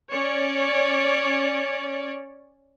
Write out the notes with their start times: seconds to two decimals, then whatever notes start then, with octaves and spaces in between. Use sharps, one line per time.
0.11 C#4 C#5 D5